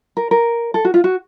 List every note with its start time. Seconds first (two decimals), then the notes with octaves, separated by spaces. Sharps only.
0.17 A#4
0.31 A#4
0.74 A4
0.85 F#4
0.94 F4
1.04 F#4